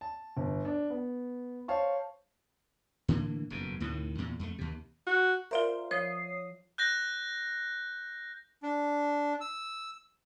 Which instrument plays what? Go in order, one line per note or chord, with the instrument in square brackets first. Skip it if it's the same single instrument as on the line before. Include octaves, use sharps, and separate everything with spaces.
[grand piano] A5
G1
D4
B3
C5 C#5 F5 A5 C#6
[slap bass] A2 D3 E3 A#3
F#1 F2 B2
D2 A2 C3 D#3
E2 A#2
F2 A3
D#2 C3
[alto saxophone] F#4
[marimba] F4 D5 E5 [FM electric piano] A#4 C5 F5
[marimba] F3 C5 [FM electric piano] C#5 D#6 C7
[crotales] F#6 G6 A#6
[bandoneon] D4
E6